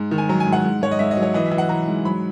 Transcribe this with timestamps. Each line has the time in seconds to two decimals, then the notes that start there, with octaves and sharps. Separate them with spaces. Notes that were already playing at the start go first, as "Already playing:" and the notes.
Already playing: G#2
0.11 D#3
0.18 G#5
0.29 F#3 A#5
0.40 G#5
0.47 G#2
0.53 F#5
0.64 G#2
0.82 G#2 C#5
0.91 D#5
0.99 G#2 E5
1.11 D#5
1.17 F#3
1.22 C#5
1.34 E3 D#5
1.46 E5
1.51 E3
1.58 F#5
1.69 E3 A#5
1.88 G#2
2.05 F#3 B5